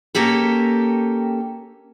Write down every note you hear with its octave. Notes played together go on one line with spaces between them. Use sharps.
A#3 C#4 G4 A4